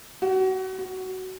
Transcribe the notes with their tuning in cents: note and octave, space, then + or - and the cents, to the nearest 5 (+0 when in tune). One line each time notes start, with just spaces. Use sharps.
F#4 +30
F#4 +15